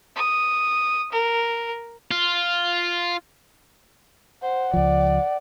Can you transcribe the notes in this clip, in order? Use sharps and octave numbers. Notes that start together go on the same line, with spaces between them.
D#6
A#4
F4
C5 F#5
C#2 F3 D5